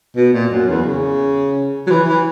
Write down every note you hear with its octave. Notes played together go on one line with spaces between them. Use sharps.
B2
A#2
F#2
E2
C#3
F#3
E3
E3